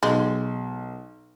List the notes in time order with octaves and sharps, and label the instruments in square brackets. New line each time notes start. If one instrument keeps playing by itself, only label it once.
[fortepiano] B1 [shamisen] G#3